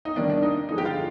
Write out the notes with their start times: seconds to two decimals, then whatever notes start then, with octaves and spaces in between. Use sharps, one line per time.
0.05 D#4
0.16 C3 D#3 G3 A#3 D4
0.30 D4
0.43 D#4
0.69 D3 F3 G#3 D#4
0.78 G4
0.85 F4